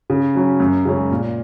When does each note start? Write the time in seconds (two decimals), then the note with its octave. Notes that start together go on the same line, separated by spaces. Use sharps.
0.10 C#3
0.35 F#3 C#4
0.60 F#2
0.85 C#3 G#3 C#4
1.11 A#2